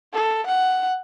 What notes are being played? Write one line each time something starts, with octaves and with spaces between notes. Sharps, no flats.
A4
F#5